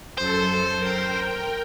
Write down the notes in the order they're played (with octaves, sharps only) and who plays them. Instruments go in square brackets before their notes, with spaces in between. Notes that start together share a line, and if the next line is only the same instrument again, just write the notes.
[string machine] F#2 A4 [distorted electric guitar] C5
[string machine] A#4 G5